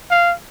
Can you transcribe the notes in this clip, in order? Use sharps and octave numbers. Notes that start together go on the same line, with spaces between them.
F5